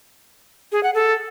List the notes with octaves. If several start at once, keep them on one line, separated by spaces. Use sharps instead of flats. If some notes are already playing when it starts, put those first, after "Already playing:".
G#4
F#5
A4